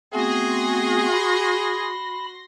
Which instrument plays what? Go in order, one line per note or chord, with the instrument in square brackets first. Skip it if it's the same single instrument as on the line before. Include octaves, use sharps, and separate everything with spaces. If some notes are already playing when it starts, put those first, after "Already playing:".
[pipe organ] A3 B3 C4 [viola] F#4 [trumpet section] G#4 [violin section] C6 A#6
[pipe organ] B5